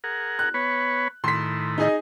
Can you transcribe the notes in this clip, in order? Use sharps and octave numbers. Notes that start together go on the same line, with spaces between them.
G#4 A#4 F#5
F#6
B3 B4 C#5
A2 D#3 E4 C6 B6
D#4 G#4 D#5